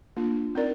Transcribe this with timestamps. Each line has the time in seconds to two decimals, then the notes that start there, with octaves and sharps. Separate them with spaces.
0.17 A#3 D4 F4
0.55 C4 D#4 A#4 D5